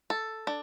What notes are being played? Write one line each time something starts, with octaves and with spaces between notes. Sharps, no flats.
A4
D4